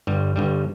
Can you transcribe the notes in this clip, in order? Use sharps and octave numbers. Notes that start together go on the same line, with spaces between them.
G1 G2 G3
G1 G2 G3